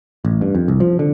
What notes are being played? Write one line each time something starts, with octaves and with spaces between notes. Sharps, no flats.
A1
G2
F2
C2
F3
D3